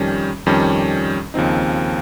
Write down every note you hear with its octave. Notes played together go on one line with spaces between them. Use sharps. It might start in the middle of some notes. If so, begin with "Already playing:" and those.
Already playing: F2 D#3 G3 C#4
F2 D#3 G3 C#4
D#2 C#3 F3 C4 D#4